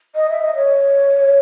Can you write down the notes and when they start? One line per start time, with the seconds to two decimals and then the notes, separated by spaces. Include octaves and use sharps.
0.15 D#5
0.30 E5
0.42 D#5
0.55 C#5